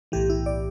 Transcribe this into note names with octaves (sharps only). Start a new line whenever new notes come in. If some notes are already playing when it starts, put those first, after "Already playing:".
B1 A2 E3 G4
E4
D5